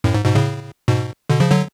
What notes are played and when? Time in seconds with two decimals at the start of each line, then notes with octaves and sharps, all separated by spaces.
0.04 F#2 A2
0.14 G#2
0.25 G#2 B2
0.35 A2 C#3
0.88 G#2 B2
1.30 B2 D3
1.40 C#3 F3
1.51 D3 F#3